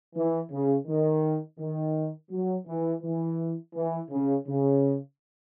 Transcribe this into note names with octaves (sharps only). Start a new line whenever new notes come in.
E3
C#3
D#3
D#3
F#3
E3
E3
E3
C#3
C#3